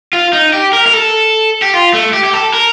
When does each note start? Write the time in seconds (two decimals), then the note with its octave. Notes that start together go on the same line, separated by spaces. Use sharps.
0.13 F4
0.33 D#4
0.53 G4
0.73 A#4
0.87 A#4
0.93 A4
1.62 G4
1.74 F4
1.93 A3
2.13 G4
2.24 G4
2.33 A4
2.54 A#4